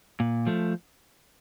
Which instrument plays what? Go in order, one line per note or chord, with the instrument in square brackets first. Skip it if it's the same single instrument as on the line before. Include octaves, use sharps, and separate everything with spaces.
[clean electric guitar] A#2
F3 A3